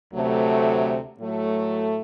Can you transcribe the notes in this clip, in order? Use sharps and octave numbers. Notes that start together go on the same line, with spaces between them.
D2 C3 F#3 A3
A2 F#3 A3